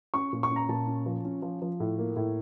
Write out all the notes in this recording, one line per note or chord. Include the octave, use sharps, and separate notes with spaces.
C#4 C#6
A#2
C#6
C#4
A#5
A#2 A5
C#4
F3
C#4
F3
F3
A2
A#3
A2